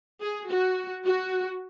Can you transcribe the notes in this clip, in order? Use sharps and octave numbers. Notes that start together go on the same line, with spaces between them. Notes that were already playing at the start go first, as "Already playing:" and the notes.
G#4
F#4
F#4